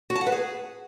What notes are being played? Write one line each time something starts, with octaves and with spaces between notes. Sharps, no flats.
F#4
A5
F#5
B4
G#4